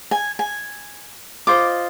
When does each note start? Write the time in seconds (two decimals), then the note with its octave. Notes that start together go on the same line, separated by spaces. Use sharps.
0.11 G#5
0.39 G#5
1.47 F4 C5 D#5 D6